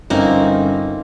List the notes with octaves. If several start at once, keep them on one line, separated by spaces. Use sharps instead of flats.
G1 A#3 C4 C#4 D#4